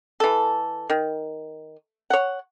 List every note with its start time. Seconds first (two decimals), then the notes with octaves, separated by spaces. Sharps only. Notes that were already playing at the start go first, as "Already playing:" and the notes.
0.20 E3 A4
0.90 D#3
2.10 C#5 F#5